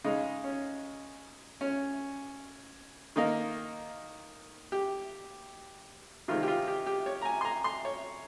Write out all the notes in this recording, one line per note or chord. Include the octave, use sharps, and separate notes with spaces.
C#3 G#3 D#4
C#4
C#4
D#3 A#3 D#4
G4
C3 D#3 G#3 F4
G4
F4
G4
G4
C#5
A#5
G#5
C6
A#5
C6
C#5